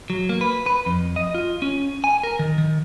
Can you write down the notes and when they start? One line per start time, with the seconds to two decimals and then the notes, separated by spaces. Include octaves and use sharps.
0.10 F#3
0.29 A#3
0.41 B4
0.66 B4
0.86 F2
1.16 D#5
1.35 F4
1.62 C#4
2.04 G#5
2.23 A#4
2.39 D#3
2.58 D#3